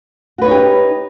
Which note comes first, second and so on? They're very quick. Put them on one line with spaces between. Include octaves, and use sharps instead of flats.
F#4 B4 C#5 D#4 G4